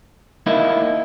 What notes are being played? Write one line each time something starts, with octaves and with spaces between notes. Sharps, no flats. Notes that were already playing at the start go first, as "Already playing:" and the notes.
A#3 D#4 E4